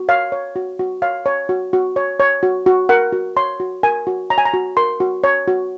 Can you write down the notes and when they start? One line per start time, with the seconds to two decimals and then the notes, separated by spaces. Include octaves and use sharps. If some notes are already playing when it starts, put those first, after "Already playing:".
Already playing: F#4
0.09 C#5 F5
0.32 C#5
0.56 F#4
0.79 F#4
1.02 C#5 F5
1.26 C#5
1.49 F#4
1.73 F#4
1.96 C#5
2.20 C#5
2.43 F#4
2.66 F#4
2.89 A#4 F#5
3.12 F#4
3.37 C#5 C6
3.60 F#4
3.83 A#4 G#5
4.07 F#4
4.30 C#5 A#5
4.38 G#5
4.45 A#5
4.54 F#4
4.77 A#4 C6
5.00 F#4
5.24 C#5
5.48 F#4